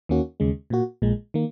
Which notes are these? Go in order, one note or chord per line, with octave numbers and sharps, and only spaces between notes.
D#2 D#3 A#3 C#4 F#4
D#2 C#3 G#3
A#2 A#3 F#4
A#1 A#2 G#3
D#3 A#3